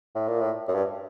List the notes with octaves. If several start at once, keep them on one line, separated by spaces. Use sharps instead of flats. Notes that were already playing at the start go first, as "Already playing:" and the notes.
A2
A#2
A2
F#2
G2